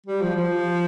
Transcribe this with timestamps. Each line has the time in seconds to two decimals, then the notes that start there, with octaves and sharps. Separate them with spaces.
0.06 G3
0.21 F3
0.36 F3